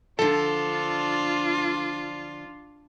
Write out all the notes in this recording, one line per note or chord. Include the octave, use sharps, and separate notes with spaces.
D3 F3 D4 F4 A4